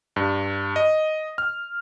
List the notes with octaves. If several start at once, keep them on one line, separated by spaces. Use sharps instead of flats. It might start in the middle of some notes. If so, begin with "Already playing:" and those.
G2
D#5
F6